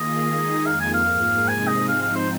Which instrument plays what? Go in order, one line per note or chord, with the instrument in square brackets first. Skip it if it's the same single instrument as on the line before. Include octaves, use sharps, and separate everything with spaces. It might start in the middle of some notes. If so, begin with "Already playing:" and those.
Already playing: [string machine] D#3 A#3 F4 G#4 [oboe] D#5
[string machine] D#3 G#3 D#4 G#4
[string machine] F2 F3 A#3 [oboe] F5
[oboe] G#5
F5
[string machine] G#2 F3 A#3 G#4
[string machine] C3 G#3 C4 D#4 G#4 [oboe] G#5
[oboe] D#5
[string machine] G#2 F3 C4 D#4 [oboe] F5
[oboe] F5
C5